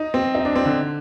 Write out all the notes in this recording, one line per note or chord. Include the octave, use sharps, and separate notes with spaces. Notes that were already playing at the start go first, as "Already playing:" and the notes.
Already playing: D#4
C4
D#4
D4
C4
D3